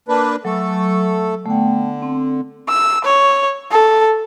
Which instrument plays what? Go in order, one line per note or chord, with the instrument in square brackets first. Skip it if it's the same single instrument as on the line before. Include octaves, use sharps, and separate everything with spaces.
[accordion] A#3 D4 B4
[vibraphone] F#3 C#6 [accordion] A3 A4
[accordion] D3 [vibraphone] A3 B3 G5
[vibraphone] C4
[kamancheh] E6
C#5
A4